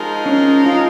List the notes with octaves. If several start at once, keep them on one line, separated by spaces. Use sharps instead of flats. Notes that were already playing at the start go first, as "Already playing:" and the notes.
Already playing: F3 G#3 D#4 A#4
C#4
F4